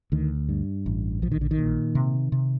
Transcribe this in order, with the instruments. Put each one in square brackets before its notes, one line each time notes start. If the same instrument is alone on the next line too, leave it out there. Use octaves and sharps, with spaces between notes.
[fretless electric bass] D2 D#3
G2
A1
A#1 F3
D#3
D3
D#3
A#2
C3
C3